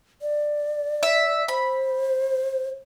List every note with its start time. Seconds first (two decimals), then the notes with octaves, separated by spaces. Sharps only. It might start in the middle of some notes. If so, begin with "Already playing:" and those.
0.22 D5
1.03 E5
1.48 C5 B5